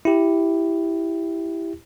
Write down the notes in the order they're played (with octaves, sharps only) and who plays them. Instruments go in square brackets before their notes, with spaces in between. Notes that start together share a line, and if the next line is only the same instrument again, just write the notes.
[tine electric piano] E4 G4